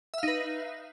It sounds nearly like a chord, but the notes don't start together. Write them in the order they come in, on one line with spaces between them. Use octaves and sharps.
E5 F5 D#4 B4